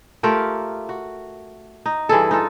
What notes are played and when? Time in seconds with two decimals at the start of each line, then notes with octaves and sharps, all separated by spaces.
0.23 A3 F4 G4 A#4
0.89 F#4
1.86 D#4
2.09 G2 E3 G#4 A4
2.31 D#4 F4 A4